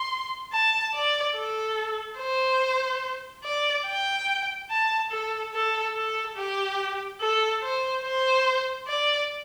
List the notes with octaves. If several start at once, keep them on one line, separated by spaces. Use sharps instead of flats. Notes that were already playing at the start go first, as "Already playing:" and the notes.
Already playing: C6
A5
D5
A4
C5
D5
G5
A5
A4
A4
A4
G4
A4
C5
C5
D5